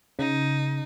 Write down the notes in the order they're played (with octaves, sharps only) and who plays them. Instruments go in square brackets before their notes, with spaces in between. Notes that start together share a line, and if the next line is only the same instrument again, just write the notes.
[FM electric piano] C#3 [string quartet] D#4